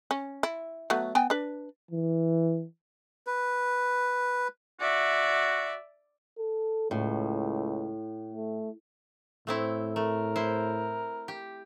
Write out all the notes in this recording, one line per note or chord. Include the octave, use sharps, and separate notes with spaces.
C#4
E4
F#3 A3 B3
B3 G5 G#5
D4 B4
E3
B4
F#4 D5 E5
A4
C#2 A2
A3
A2 A3 C4 E4
A3 A#4
E4 C5
G4